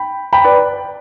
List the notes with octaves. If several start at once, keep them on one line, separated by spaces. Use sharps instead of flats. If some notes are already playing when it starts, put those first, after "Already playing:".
Already playing: G5 B5
G5 B5
B4 D5